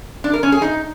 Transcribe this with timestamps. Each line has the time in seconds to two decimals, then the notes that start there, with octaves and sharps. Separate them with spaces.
0.24 D4
0.34 A#4
0.43 C#4
0.52 G#4
0.62 D#4